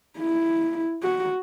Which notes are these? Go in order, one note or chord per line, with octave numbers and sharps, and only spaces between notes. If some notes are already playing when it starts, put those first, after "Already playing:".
E4
F#4